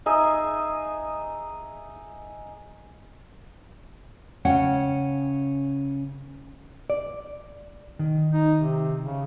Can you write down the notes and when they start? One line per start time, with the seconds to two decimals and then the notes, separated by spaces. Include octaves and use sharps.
0.06 D#4 G#4 D#5 E5
4.45 C#3 C#4 F#5 G5
6.90 D5
7.99 D#3
8.33 D#4
8.59 C3
9.05 C#3